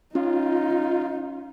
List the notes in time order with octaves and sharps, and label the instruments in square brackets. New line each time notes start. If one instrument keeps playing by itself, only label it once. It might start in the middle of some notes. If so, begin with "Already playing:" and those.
[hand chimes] C#4 [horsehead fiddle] D#4 [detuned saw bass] F4